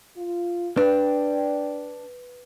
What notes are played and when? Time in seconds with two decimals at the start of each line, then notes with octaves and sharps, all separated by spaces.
0.16 F4
0.77 D4 B4 D5 G5